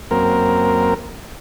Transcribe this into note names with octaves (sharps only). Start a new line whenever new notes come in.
F#2 A#3 C4 A#4